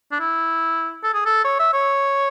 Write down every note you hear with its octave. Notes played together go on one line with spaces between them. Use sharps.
D4
E4
A4
G#4
A4
C#5
E5
C#5